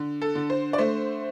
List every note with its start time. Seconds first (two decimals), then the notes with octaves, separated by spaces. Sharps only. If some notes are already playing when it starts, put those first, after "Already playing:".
Already playing: D3
0.22 A4
0.35 D3
0.50 C5
0.73 D5
0.78 A3 C5